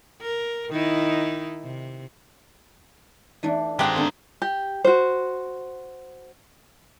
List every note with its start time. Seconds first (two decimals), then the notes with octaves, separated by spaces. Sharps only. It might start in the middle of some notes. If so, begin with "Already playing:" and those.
0.21 A#4
0.70 D#3 D#4 E4
1.64 C3
3.43 E3 A3 D4 D#4
3.79 D#3 G#3 C4 G4 A4 F5 F#5
3.96 D3 A#3 C4 D4 A#4
4.42 G4
4.85 F#4 C5